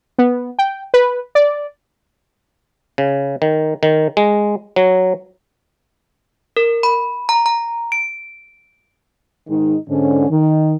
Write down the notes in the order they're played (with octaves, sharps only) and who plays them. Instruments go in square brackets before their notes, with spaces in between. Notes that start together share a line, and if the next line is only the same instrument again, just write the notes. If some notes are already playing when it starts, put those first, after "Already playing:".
[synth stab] B3
G5
B4
D5
[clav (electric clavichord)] C#3
D#3
D#3
G#3
F#3
[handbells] A#4
B5
A#5
A#5
D7
[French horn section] G#2 D#3 G#3 D#4
G#2 D3 C#4
D#3